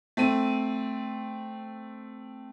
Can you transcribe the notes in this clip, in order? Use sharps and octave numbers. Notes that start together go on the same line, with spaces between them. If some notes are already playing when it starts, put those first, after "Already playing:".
A3 C4 D#7